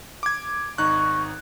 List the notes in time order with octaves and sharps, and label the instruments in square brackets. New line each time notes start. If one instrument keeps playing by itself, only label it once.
[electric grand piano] D6 G#6
[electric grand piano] G#1 D#4 F#6 [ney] C#6